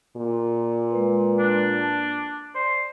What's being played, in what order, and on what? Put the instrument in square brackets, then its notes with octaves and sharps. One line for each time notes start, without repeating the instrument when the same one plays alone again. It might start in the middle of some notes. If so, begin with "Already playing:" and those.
[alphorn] A#2
[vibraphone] G#3 B4
[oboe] D4
[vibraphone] A5
[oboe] C5 [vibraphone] D5